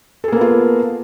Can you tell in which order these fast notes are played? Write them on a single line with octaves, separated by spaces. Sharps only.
A4 G#4 A#3 B3 F4